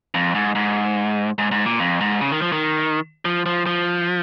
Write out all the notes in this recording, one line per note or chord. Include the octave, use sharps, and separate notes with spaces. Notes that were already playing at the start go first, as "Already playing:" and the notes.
F2
G#2
G#2
G#2
G#2
A#2
F2
G#2
C#3
D#3
F3
D#3
F3
F3
F3